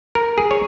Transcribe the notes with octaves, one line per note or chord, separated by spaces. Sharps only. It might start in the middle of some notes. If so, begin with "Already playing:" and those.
A#4
G#4
C#5